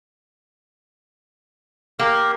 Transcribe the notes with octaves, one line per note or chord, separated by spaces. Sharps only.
A#3 G4 A#4